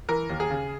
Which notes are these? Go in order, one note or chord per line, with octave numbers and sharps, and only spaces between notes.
E3 A#4
D#2
G#4
C#3